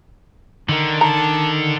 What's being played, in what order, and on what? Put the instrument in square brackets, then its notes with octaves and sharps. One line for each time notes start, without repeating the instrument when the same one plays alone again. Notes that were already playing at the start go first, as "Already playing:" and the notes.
[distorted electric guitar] D3 [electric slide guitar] D#3 A#4
[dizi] A5 [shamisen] A#5